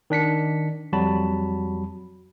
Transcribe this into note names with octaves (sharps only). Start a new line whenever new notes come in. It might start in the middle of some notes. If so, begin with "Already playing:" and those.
D#3 D4 B6 C#7
F2 F#3 G3 F#4 A5 B5